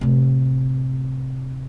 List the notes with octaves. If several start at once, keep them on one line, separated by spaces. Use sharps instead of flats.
A2 C3